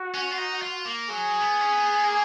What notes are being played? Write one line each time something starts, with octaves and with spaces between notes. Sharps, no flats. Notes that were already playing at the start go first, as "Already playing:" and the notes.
Already playing: F#4
C#4
F4
D#4
F4
A#3
F#3 G#4
B3
C#4
B3
A#3